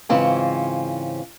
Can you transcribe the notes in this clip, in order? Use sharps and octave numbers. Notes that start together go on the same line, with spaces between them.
G#2 C#3 E3 C4 C#4 F4